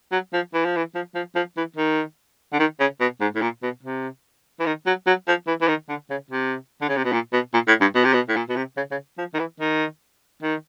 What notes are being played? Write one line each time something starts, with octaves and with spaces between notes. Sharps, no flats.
F#3
F3
E3
F3
E3
F3
F3
F3
E3
D#3
D3
D#3
C#3
B2
G#2
A2
A#2
B2
C3
E3
D#3
F#3
F#3
F3
E3
E3
D#3
D3
C#3
C3
D3
C#3
C3
B2
A#2
B2
A#2
A2
G2
B2
C3
B2
A2
A#2
B2
C3
C#3
C#3
F3
D#3
E3
D#3
D#3